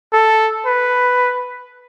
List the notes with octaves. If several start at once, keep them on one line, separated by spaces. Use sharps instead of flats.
A4
B4